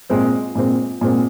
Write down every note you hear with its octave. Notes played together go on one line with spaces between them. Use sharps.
A#2 G#3 C4
A#2 G#3 C4
A#2 G#3 C4